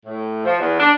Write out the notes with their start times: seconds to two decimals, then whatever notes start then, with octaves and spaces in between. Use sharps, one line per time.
0.06 A2
0.44 F3
0.59 E2
0.79 D4